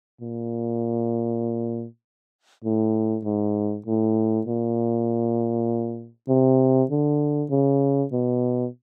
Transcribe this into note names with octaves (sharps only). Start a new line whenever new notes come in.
A#2
A2
G#2
A2
A#2
C3
D3
C#3
B2